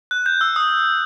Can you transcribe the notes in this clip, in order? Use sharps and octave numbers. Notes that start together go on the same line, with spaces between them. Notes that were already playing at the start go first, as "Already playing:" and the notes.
F#6
G6
E6
D#6